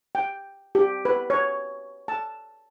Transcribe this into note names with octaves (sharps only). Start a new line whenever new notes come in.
G5
G4
B4
C#5
A5